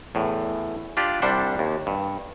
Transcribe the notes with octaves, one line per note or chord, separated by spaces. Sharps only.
E2 A2
D4 F4 G4 D5
C2 G3 D4 C5 F#5
D#2
G2